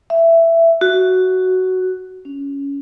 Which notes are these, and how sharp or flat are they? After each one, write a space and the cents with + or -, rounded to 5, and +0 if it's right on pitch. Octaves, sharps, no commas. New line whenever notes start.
E5 +10
F#4 +10
C#4 +15